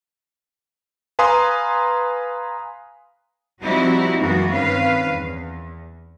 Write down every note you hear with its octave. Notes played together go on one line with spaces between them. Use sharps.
B4 F5 G#5 A#5 C6 D#6
F3 G3 C4 D#4 E4 F#4
F#2 E3 G#3 A#3 B3 F#4
G2 D#3 C4 C#4 B4 F5
E2